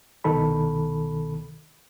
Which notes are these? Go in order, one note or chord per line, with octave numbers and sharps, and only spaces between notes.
C2 B2 D#3 A4 B5